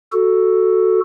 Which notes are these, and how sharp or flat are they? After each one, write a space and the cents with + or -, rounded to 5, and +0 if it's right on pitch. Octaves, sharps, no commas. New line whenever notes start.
F#4 +0 A4 +0